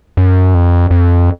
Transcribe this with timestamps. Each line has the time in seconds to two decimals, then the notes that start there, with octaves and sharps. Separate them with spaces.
0.17 F#2
0.54 F2
0.91 F2